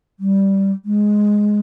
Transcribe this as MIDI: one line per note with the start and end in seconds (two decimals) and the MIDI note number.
0.20 0.72 55
0.85 1.60 56